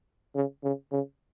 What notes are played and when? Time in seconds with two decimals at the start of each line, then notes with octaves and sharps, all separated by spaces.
0.36 C#3
0.64 C#3
0.92 C#3